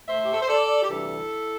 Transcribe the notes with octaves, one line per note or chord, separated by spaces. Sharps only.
A2 A3 C5 E5
G4
A4
C5
A4 D5
G4
D2 C3 E3 G3 E4 A4